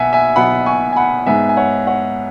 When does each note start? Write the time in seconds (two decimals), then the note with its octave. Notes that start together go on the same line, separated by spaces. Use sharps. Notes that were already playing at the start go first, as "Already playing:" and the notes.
Already playing: B1 B2 B3 E5 F#5 G#5
0.13 E5 G#5
0.36 B1 B2 B3 F#5 B5
0.66 G#5 C#6
0.93 G#5
0.96 F#5 B5
1.26 G#2 G#3 B3 E5 G#5
1.49 G#5
1.57 C#5 F#5
1.87 C#5 F#5